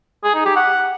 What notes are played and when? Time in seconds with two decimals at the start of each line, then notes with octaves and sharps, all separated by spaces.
0.24 G#4
0.35 D#4
0.45 G4
0.56 F#5